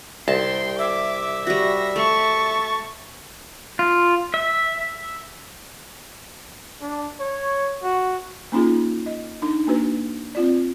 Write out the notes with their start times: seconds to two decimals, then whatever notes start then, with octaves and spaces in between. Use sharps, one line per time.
0.28 C2 G5 A5 C6
0.79 E5 D6
1.47 G3 F#4 A#6
1.96 A3 A5 C#6
3.79 F4
4.34 E5
6.82 D4
7.20 C#5
7.83 F#4
8.52 A#3 C#4 D#4 F4 G#4
9.06 D#5
9.42 D4 D#4
9.67 A#3 D4 F#4 B4
10.35 C4 F4 D5